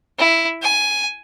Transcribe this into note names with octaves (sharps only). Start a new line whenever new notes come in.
E4
G#5